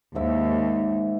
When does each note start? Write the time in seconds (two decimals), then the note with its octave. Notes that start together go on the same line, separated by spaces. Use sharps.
0.15 D#2 G#2 E5 D6